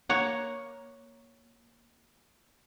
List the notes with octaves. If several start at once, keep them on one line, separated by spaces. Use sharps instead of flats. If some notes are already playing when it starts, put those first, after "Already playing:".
A#3 C#5 F#5